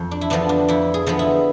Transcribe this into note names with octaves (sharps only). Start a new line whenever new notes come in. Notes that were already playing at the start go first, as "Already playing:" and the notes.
Already playing: F2
D4
E4
D3 F3 B3 D4
D4
F2 E4
G#4
D3 F3 B3
E4